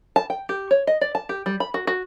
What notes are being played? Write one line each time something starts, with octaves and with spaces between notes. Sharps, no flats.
A5
G5
G4
C#5
D#5
D5
A5
G4
G3
B5
F#4
F#4